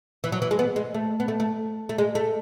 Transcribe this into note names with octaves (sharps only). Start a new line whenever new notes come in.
E3
F#3
E3
G#3
B3
G#3
A3
B3
A3
A3
A3
G#3
A3